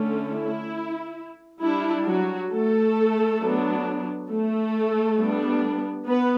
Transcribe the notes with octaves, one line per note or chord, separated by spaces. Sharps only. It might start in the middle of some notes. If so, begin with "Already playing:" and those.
Already playing: D3 A3 C#4
E4
G3 D4 E4
F#3 F#4
A3 A4
F#3 B3 D4
A3 A4
G3 B3 D4
B3 B4